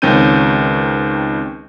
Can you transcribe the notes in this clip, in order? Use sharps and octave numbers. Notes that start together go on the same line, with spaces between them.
C#2 D#3 C4 C#4 G6 D#7